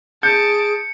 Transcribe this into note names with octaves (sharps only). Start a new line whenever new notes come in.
G#4 A5 G6 C#7 D7